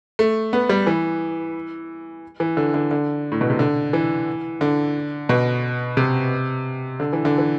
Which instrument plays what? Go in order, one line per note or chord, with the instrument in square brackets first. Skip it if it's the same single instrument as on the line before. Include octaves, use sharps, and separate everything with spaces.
[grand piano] A3
B3
G3
E3
E3
D3
D3
D3
A2
B2
C3
D3
E3
D3
B2
C3
D3
E3
D3
E3